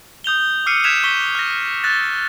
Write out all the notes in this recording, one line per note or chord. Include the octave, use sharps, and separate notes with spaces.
D#6 G6 F7 G7
D6 E6 F6 C7 C#7 D#7
F#6 G#6 B6 E7 F7
C#6 B6 D#7 G7
F6 A#6
E6 F#6 A6 A#6